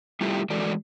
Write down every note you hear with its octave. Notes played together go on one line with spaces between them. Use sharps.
G3 A3 E4 F4 G4
E3 G#3 F#4 A4 D5